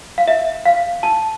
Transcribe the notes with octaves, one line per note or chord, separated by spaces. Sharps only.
F5
E5
F5
A5